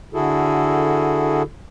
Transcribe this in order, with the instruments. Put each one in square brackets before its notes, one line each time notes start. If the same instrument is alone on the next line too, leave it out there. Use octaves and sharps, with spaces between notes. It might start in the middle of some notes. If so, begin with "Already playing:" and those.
[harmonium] D3 E4 F#4 G#4 A4